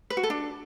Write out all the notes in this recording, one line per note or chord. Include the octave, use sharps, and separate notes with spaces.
B4
F#4
A4
D4